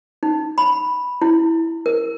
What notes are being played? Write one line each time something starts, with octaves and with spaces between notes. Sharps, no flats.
D#4
B5
E4
A#4